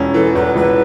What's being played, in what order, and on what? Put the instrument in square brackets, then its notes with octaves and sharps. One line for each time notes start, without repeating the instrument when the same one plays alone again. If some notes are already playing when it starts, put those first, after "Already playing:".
Already playing: [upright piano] E1 E2 C#4
[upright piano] E3 [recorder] A4
[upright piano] E2 [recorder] B4
[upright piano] E1 [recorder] B4